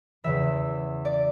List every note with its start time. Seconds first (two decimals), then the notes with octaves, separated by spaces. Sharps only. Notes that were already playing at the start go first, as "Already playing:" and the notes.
0.24 E2 C#3 E3 E5
1.05 D5